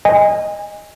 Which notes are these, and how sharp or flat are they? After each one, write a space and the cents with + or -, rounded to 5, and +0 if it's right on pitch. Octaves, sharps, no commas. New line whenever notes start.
D#5 +0 G#5 -30